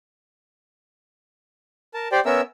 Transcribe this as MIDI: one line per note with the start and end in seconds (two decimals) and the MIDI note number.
1.94 2.08 70
1.94 2.08 81
2.12 2.20 67
2.12 2.20 72
2.12 2.20 74
2.12 2.20 79
2.25 2.41 59
2.25 2.41 61
2.25 2.41 70
2.25 2.41 76
2.25 2.41 88